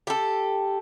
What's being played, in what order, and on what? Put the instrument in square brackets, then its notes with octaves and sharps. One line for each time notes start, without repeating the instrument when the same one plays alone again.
[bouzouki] G4 A4